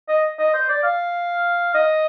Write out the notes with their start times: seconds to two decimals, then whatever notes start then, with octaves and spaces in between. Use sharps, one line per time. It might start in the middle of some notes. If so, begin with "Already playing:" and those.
0.08 D#5
0.39 D#5
0.54 C5
0.69 D5
0.83 F5
1.74 D#5